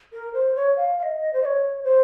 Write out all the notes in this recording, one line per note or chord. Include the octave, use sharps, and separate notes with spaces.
A#4
C5
C#5
F5
F5
D#5
C5
D#5
C#5
C5